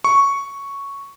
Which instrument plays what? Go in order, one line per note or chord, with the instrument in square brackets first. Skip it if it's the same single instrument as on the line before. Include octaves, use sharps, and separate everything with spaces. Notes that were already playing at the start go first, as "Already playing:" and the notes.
[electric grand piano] C#6